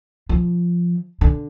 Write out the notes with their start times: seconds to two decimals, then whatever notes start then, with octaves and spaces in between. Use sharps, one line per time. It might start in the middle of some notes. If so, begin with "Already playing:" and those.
0.29 F3
1.21 D3